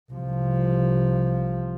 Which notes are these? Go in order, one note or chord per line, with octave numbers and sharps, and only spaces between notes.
C2 F3